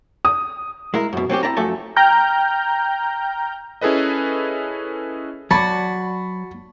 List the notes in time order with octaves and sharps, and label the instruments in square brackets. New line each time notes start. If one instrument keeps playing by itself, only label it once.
[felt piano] D#6
[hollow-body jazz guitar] G#3 E4 A#4
F#2 B2
F#3 C4 C#4 G4
C4 E4 D5 A5 A#5
F#2 F3 A3 A4 E5 G#5
[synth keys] G5 A#5 F6 G6
[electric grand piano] C#4 E4 G#4 A4 B4 D#5
[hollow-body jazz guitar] F#3 D5 [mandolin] F#4 [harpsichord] A5 [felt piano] B5